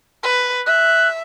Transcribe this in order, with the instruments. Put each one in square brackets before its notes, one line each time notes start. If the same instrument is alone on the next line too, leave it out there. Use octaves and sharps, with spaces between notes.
[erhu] B4
[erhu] E5 [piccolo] F#6